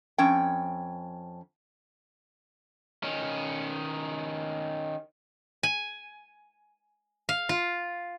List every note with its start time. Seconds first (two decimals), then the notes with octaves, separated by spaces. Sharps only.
0.18 F2 C#4 G5
3.04 D#3 C#4
5.63 G#5
7.29 F5
7.49 F4